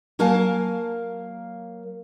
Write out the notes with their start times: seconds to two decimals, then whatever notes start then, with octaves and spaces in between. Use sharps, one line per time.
0.19 F#3 A#3 A#4 F5 G#5 A5